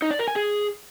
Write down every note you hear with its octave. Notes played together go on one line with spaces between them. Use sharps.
D#4
D5
A#4
G#5
G#4